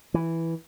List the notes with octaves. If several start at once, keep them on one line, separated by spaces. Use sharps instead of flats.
E3